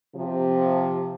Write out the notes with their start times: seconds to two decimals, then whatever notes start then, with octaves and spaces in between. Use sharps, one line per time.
0.15 C3 F3